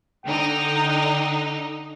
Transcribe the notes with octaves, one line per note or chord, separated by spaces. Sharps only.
D3 D#4 G5